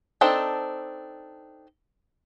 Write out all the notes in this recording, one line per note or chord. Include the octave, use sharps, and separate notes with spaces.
C4 D4 D#4 A4